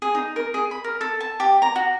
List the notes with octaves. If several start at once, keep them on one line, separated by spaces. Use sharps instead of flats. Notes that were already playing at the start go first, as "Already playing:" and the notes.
G#4
D#4
A#4
G#4
B5
A#4
A4
A5
G4
A#5
F#4